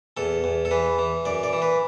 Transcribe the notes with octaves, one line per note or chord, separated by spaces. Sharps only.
E2 A4
E2
A4
E3 B4
E3
F#2 D5
D5
E3
B4